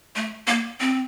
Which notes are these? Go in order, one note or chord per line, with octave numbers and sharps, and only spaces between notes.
A3
A#3
C4